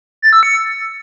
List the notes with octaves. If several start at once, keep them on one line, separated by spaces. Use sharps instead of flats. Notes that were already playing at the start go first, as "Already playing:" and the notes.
A6
E6
C#7